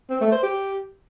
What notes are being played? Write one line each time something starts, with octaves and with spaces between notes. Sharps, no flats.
C4
A3
C5
G4